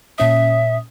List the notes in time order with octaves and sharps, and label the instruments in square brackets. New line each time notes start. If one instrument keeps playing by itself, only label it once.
[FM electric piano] A#2 C#4 D#6 [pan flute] E5